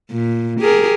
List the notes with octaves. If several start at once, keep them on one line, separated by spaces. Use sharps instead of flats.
A#2
G4 G#4 A#4